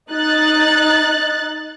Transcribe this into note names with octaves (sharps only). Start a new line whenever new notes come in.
D#4 F#6 A6